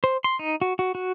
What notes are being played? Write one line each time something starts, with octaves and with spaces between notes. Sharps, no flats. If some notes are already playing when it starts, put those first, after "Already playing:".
C5
C6
D#4
F#4
F#4
F#4